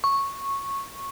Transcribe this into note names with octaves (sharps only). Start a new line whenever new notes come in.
C#6